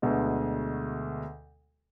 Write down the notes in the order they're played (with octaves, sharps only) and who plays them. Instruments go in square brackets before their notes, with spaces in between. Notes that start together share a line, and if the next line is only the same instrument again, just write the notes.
[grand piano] D2 B2 D3 G#3